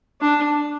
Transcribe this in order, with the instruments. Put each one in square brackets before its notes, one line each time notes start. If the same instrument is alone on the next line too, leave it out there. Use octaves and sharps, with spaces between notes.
[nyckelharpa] D4